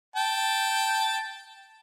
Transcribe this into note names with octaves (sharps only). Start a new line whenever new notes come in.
G5 A5